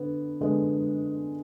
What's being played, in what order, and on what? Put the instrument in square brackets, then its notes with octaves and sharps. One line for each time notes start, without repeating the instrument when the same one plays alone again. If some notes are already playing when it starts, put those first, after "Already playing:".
Already playing: [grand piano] D3 B3
D3 G#3 B3